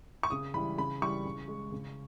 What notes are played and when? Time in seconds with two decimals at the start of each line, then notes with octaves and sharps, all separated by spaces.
0.23 C#6
0.30 C#3 D#6
0.54 E3 G3 B5
0.78 C#3 B5
1.02 E3 G3 C#6
1.25 C#3
1.48 G#3
1.72 C#3